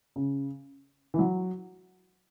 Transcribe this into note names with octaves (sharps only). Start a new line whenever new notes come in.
C#3
E3
F#3